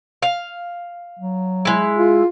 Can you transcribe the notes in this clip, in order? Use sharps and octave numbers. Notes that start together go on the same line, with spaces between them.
F5
F#3
G#3 E4
F4